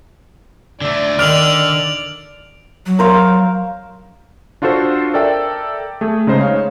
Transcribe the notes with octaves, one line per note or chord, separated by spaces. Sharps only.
D3 A3 D5
D3 D#3 F6 D7 F7 F#7
F#3
A#4 C5 F5
D4 F4 F#4 A4 C5
A4 A#4 D5 E5 G5
A3 G#4
C#3 G#3 D#4 C5
C#5 F5